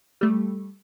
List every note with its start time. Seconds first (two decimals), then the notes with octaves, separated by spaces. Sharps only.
0.21 G3 A3